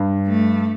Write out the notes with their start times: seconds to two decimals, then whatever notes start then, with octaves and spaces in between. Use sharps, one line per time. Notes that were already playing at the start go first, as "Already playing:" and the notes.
Already playing: G2
0.28 A3